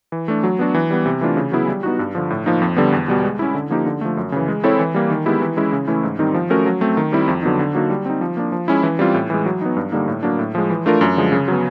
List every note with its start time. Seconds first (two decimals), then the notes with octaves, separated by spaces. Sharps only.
0.12 E3
0.28 A3 D4
0.43 F#3
0.59 B3 D4 F#4
0.74 E3
0.90 G3 B3
1.06 C3
1.21 E3 A3 D4 F4
1.37 C#3
1.52 F#3 B3 E4 G#4
1.68 G3
1.83 B3 D#4 F#4
1.99 G2
2.15 D3 F3
2.30 A2
2.46 F3 A#3 D#4
2.62 F2
2.76 D3 G3 B3
2.92 E2
3.08 B2 G3 B3
3.24 G#3
3.39 C#4 E4
3.54 D3
3.70 F3 A#3 D#4 G4
3.86 D3
4.01 F3 A3
4.17 F#2
4.32 C#3 E3
4.48 G#3
4.64 C4 E4 A4 C#5
4.79 E3
4.94 G3 A#3
5.10 D#3
5.26 G#3 B3 E4 G4
5.42 E3
5.57 G#3 C#4 E4
5.72 C#3
5.88 E3 A3 C#4 E4
6.03 G#2
6.19 D#3 G3 C4 D#4
6.34 F3
6.50 A3 C#4 F#4 A#4
6.66 F#3
6.81 A3 C4
6.97 D#3
7.12 G3 C4 E4
7.28 F2
7.43 D3 F#3 B3 D#4
7.59 D3
7.75 F#3 A#3 D#4 F#4
7.90 G3
8.05 C4 D#4
8.21 F3
8.37 A#3 D4
8.52 F3
8.68 G#3 C#4 E4
8.83 E3
8.99 G3 C4 F4
9.14 A2
9.30 E3 G#3
9.46 F#3
9.61 B3 D#4
9.76 G2
9.92 D3 G3 A#3 D#4
10.08 A2
10.23 F#3 A#3 D4
10.39 A2
10.55 F3 G#3
10.70 E3
10.86 A3 D4 F4 A#4
11.01 F#2
11.17 D3 F3 G#3
11.32 C#3
11.48 F#3 B3